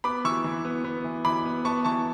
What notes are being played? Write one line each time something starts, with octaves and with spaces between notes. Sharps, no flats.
B3 B5 D6
E3 C#6 E6
E3
B3
B3
E3
E3 B5 D6
B3
B3 A5 C#6
E3 A5 C#6